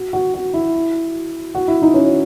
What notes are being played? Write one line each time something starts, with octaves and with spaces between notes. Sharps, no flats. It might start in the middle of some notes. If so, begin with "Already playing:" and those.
Already playing: F#4
F#4
F#4
E4
F#4
E4
D#4
C#4